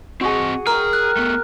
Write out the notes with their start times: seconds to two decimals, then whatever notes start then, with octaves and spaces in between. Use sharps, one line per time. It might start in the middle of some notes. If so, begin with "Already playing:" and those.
0.21 C4 F#4 G#4 D#5
0.67 G#4 A#4 G5 F6
0.93 F#6
1.17 A3 B3